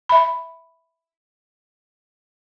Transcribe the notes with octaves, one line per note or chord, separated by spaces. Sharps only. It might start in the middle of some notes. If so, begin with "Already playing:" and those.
E5 B5